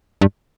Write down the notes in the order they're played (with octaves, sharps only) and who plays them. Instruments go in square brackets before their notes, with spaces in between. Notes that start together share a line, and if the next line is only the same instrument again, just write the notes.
[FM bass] G2